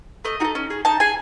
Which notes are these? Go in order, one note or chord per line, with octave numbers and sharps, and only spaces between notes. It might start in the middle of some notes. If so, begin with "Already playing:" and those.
A3 D#5
D#4 F#4 A4
C#4
G#4
D#4 A5
G#4 G#5